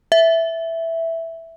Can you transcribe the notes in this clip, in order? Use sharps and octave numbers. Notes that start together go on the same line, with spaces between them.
E5